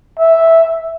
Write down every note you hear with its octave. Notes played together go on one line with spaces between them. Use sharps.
E5